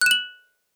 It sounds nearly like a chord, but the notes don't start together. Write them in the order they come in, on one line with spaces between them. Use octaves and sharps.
F#6 E7 F#7